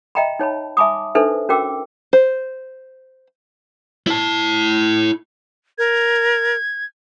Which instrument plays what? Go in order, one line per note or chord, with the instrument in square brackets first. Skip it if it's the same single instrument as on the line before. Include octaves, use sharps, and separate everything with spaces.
[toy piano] D#5 E5 G5 A#5 B5
D#4 C#5 A5 B5
E5 G#5 A5 B5 D6 D#6
D4 D#4 A4 B4 C5 E5
C#4 F#4 A#4 G5 D6 E6
[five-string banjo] C5
[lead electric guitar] E4 A5
[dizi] A#4 [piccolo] G#6